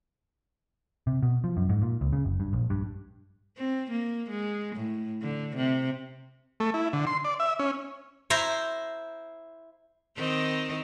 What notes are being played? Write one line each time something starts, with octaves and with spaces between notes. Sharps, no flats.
C3
B2
F3
F#2
G#2
A#2
C#2
C#3
F#1
G2
A#1
G2
C4
A#3
G#3
A2
D3
C3
A3
E4
D3
C6
D5
E5
C#4
E4 C5 A#5
D#3 C4